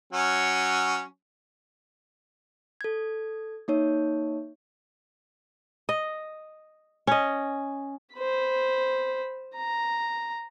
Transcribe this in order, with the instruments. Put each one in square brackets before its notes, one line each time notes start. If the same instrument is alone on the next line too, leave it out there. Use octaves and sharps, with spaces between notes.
[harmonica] F#3 C#4
[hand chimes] A4 G#6
A#3 D#4 C#5
[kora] D#5
C#4 D#5
[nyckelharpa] C5 B5
A#5